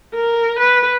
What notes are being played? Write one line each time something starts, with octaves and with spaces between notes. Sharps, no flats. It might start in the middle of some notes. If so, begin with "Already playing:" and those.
A#4
B4